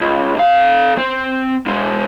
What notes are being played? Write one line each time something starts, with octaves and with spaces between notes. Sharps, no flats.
C#2
C3 F5
C4
B2 G#3